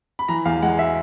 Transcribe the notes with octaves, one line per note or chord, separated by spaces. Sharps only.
B5
E3 A#5
E2 F5
G#3 F#5
E5